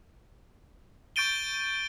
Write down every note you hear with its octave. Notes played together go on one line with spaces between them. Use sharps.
C#6 G6 A6 D7 D#7 G7